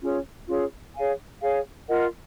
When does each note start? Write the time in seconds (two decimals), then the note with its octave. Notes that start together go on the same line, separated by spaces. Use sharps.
0.02 C#4 F4 G#4 C#5
0.48 C#4 F4 G#4 C#5
0.95 G#4 C#5 F5 G#5
1.42 G#4 C#5 F5 G#5
1.88 F4 A#4 D#5 F#5